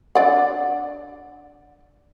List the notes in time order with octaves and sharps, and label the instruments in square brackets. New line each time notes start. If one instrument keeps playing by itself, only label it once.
[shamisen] D4 D5 F#5